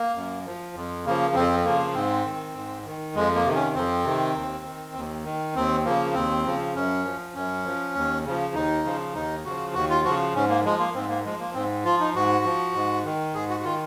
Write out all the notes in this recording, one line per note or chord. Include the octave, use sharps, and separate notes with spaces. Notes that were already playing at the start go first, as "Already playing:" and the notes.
Already playing: A#3
F#2
F3
F2
C#3 F3 A#3
F2 C4
C#3 F3 A#3
G#2 C4
D#3
G#2
D#3
F2 G#3
A#3
C3 D#3
C#4
F2 C4
C3 D#3
D#2
D#3
D#2
D#3
D#2 C4
C#3 F3 A#3
D#2 C4
C#3 F3
F#2 C#4
F3
F#2 C#4
F3
D#2
C#3 F3
D#2 D#4
C#3 F3
D#2 D#4
C#3 F3 F#4
D#2 F#4
F4
C#3 F3 F#4
G#2 C#4
A#3
F3 G#3
A#3
G#2 C4
A#3
F3 G#3
A#3
G#2 C4
F3 F4
D#4
G#2 F#4
F3
G#2
D#3
G#2 G#4
F#4
F#4
D#3 F4